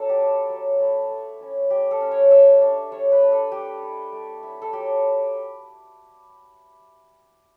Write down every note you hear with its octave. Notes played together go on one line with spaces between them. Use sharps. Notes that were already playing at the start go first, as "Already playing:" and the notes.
Already playing: F#3 D4 A4
G4
A3 E4
F#3
A3 E4
A3
C#4 E4
A3 G4
A4
C#4 E4
C#5
G3 E5
D4
G3 C#5
B4
D4
A4
A3 G4
E4
A3
E4
A4
F#3 G4